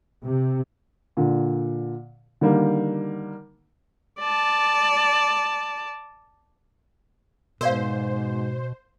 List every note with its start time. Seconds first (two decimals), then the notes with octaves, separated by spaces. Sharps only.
0.24 C3
1.17 A#2 D3
2.41 D3 D#3 G3 A#3
4.19 D5 A5
7.61 G#2 B2 A#4 C5 D5 F5